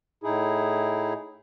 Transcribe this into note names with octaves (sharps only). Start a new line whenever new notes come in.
A2 D#4 E4 G#4